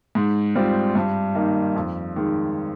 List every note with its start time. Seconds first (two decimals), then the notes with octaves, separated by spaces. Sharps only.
0.15 G#2
0.55 G3 C4 F4
0.95 G2
1.35 D#3 A#3 D#4
1.76 F2
2.16 D#3 G#3